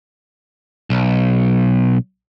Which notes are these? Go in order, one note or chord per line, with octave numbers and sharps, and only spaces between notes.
B1